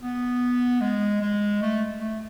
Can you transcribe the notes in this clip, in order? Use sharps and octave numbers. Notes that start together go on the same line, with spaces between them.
B3
G#3
G#3
A3
A3